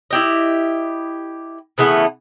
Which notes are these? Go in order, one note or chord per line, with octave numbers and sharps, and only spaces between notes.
E4 G4 D#5
C#3 E3 A3 B3